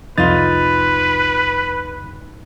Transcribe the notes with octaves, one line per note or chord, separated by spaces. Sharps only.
C2 F2 D#4 F4 B4 A6